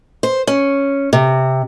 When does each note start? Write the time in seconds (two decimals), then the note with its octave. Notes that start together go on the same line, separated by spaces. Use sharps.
0.23 C5
0.47 C#4
1.13 C3